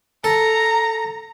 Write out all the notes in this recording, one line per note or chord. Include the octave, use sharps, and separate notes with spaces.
A4 A#5